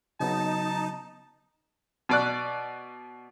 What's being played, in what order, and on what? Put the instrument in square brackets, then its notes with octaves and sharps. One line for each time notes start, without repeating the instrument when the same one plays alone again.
[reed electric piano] C#3 F#3 B3 [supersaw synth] D#4 [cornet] A5
[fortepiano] B2 D5 F#6